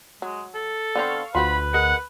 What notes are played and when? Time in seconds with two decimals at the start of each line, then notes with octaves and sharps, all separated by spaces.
0.22 F#3 G#3
0.55 A4
0.95 D3 B3 C4 F5 C#6
1.35 D2 F4 F#4 B4 C5 B5
1.74 G#4 A#4 D#5 F#5